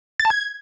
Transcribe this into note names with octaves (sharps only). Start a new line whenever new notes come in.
A6
A5
G#6